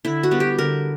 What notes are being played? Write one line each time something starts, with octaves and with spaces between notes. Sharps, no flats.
D3 E4
F#4
G3 B3
G4
D3 A#4